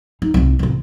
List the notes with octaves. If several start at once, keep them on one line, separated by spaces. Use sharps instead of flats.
D#4
C2 C3
A1 C3